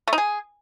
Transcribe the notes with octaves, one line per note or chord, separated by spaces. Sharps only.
A3
D#4
G#4